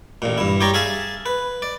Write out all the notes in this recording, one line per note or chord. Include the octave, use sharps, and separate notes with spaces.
A1 A#2
G2 E4
G4 C#5 D5 A#5
G#4 E5 F5 G#5 A5
B4
D5